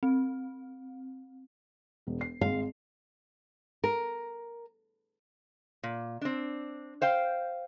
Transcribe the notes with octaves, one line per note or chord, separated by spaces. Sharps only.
C4
E1
C7
G#1 G#3 F5
A#4
A#2
C4 D4
C5 F5 G5